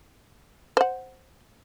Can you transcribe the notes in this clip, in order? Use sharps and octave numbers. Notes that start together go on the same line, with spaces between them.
C5 F#5